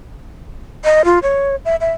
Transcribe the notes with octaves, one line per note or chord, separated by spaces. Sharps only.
D#5
F4
C#5
E5
E5